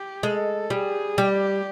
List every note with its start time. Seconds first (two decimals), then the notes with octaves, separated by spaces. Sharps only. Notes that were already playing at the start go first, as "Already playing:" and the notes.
Already playing: G4
0.23 G#3 A4
0.70 G3 G#4
1.18 G3 G4